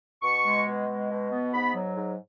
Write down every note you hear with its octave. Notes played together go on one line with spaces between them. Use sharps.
B2 C#6
G#3
B2
G#3
B2
B3
G#2 B5
F#3
G#2